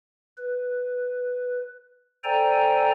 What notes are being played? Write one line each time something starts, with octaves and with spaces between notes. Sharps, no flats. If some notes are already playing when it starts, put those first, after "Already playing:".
B4
A4 C5 D5 G5 G#5 A#5